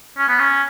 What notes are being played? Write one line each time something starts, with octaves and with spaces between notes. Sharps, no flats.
C#4
B3
C#4